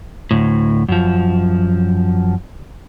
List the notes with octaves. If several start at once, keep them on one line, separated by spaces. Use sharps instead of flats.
D2 A2
F#2 F3